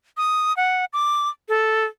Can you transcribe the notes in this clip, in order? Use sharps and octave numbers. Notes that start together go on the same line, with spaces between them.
D#6
F#5
D6
A4